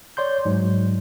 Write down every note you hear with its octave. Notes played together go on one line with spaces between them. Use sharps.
C#5 D5 C6 G6
G#2 F#3